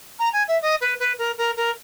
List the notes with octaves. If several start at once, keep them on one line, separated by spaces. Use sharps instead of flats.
A#5
G#5
E5
D#5
B4
B4
A#4
A#4
A#4